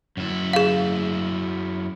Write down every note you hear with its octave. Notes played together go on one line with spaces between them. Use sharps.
F#2 E4
G#4 F5